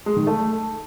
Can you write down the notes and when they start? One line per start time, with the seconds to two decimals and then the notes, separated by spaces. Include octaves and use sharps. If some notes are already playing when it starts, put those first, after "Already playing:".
0.06 G#3
0.17 D#3
0.27 A3